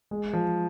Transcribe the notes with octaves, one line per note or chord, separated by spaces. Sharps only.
G#3
F3